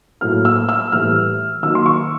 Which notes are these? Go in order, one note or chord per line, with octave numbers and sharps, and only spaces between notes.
A2 F#3 A#3 F6
E6
E6
A2 E3 G3 F6
D#3 F#3 A#3 D#4 E6
C6
C#6